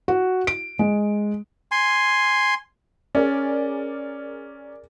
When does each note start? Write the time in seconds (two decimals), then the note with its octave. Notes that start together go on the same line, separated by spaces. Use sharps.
0.08 F#4
0.47 D7
0.79 G#3
1.72 G#5 C6
3.15 C#4 G#4 A#4 D5